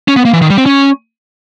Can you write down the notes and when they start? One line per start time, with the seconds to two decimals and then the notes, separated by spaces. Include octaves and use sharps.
0.08 C#4
0.16 B3
0.25 A#3
0.33 E3
0.42 D#3
0.50 G3
0.58 C4
0.66 C#4